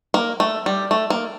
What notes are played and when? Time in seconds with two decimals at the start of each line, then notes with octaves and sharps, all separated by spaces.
0.14 A#3
0.40 A3
0.66 G3
0.91 A3
1.10 A#3